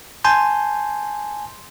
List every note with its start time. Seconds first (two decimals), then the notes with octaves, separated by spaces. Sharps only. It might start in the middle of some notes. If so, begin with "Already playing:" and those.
0.24 G#5 A5 C6 G6